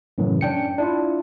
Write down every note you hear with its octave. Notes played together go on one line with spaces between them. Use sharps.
F#2 A2 C#3 E3
C#4 D4 G5 C#7
D4 E4 F4